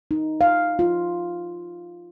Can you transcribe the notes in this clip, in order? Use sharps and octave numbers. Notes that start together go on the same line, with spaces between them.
D#4
F5
F4